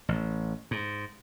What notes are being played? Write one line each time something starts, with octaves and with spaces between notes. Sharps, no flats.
A1
G#2